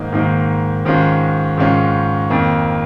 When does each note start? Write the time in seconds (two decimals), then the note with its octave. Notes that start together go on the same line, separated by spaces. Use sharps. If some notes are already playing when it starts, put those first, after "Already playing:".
Already playing: G#2 D#3 A#3 D#4
0.13 G#2 D#3 A#3 D#4
0.85 G#2 D#3 G#3 C#4 F4
1.57 G#2 D#3 G#3 C#4 F4
2.30 F2 D#3 A#3